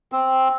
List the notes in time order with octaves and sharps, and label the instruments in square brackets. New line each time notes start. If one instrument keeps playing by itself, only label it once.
[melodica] C4